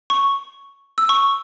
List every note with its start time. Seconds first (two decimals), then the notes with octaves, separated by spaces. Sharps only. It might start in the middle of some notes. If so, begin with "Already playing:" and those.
0.10 C#6
0.98 E6
1.09 C#6